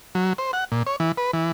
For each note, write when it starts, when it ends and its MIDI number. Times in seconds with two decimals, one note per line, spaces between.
0.15 0.33 54
0.38 0.51 72
0.53 0.64 78
0.72 0.83 46
0.87 0.96 73
1.00 1.12 52
1.18 1.31 71
1.33 1.52 52